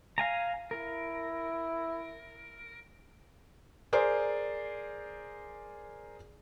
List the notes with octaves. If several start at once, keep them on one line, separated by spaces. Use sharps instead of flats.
F5 G#5 A#5
E4 A#4
G#4 A#4 C5 D5